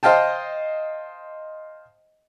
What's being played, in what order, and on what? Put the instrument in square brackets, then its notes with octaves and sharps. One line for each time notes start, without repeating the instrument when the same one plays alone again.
[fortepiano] C5 D#5 F5 G5 A5